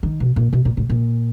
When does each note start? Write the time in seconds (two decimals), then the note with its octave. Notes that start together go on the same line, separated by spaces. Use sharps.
0.03 D#3
0.20 B2
0.36 A#2
0.53 B2
0.65 A#2
0.77 A2
0.89 A#2